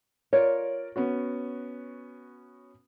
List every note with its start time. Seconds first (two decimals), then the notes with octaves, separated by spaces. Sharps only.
0.33 F4 A#4 C#5 D5
0.96 B3 C#4 F#4